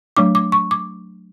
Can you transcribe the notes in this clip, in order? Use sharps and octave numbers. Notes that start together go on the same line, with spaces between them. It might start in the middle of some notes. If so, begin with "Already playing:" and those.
F#3 A3 D4 D6
D6
C#6
D6